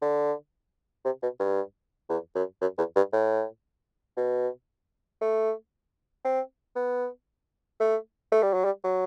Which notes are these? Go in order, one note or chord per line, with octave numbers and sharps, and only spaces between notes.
D3
C3
B2
G2
E2
F#2
F#2
E2
G2
A2
B2
A3
C4
B3
A3
A3
G3
F#3
G3
F#3